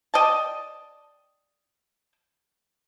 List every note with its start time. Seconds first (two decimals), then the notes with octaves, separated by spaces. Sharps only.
0.14 D5 D#5 G5 A5